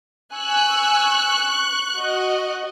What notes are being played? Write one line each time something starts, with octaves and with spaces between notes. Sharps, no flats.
G#5 C#6 E6 F#6
F#4 D#5